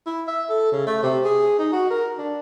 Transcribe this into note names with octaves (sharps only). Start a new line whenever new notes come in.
E4
E5
A4
C#3
A3
C3
G#4
D#4
F#4
A#4
D4